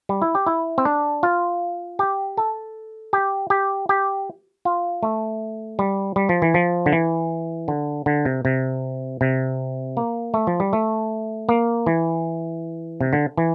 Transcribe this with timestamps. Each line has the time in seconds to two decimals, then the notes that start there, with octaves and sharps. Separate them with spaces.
0.09 G3
0.22 E4
0.35 G4
0.47 E4
0.78 C4
0.85 D4
1.23 F4
1.99 G4
2.37 A4
3.13 G4
3.50 G4
3.89 G4
4.65 F4
5.03 A3
5.79 G3
6.16 G3
6.29 F3
6.42 E3
6.54 F3
6.86 D3
6.93 E3
7.68 D3
8.06 D3
8.25 C3
8.45 C3
9.21 C3
9.97 A#3
10.34 A3
10.47 F3
10.60 G3
10.73 A3
11.49 A#3
11.86 E3
13.01 C3
13.13 D3
13.37 E3